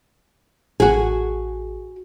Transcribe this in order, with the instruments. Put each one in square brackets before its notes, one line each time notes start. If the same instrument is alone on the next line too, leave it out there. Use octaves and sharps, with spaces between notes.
[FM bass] A1 [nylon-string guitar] F#4 G#4